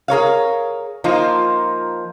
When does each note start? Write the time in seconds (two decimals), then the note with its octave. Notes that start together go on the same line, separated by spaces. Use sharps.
0.08 G#4 A#4 C#5 F5
1.04 F3 A#3 D#4 F4